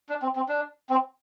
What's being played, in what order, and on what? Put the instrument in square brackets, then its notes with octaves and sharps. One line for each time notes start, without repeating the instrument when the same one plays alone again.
[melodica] D4
C4
C4
D4
C4